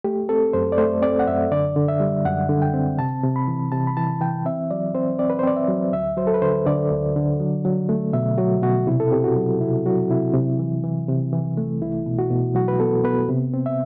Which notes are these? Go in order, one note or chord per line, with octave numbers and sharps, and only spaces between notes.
A3 G4
C4 A4
F#2 C5
D5
A3 C5
C4 D5
F#5
F#2 E5
D3 D5
D3
E5
G3
F#2 F#5
D3
G5
C4
C3 A5
C3
B5
E3
C3 A5
B5
E3 A5
E3 G5
C4 E5
F#3 D5
C4 C5
C4 D5
B4
C5
C4 D5
E5
F#3
D2 E5
F#3 C5
A4
B4
D3 C5
D3 D5
D2
D3
F#3
F#3
A3
B2 E5
F#3 F#4
B2 F#4
C3 E4
A4
C4 G4
F#4
F#3
C3 E4
F#3 F#4
C3 E4
C3
E3
E3
C3
E3
A3
C2 E4
B2
F#4
B2
F#3 F#4
B4
B3 A4
B3 B4
C3
C4
E5